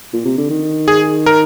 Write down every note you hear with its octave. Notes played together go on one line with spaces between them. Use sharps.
A#2
C3
D3
D#3
G#4
A#4